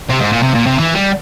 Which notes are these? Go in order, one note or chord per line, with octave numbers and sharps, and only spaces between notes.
C3
G#2
A#2
C3
A#2
C3
E3
G3